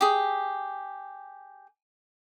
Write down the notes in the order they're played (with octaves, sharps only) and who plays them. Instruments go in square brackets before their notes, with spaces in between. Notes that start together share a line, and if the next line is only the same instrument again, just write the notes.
[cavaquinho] G4 G#4